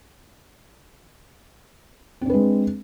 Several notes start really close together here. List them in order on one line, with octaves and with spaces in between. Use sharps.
C4 D4 B4 G#3